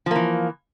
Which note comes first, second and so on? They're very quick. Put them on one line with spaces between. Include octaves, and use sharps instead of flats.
F3 A#3 E3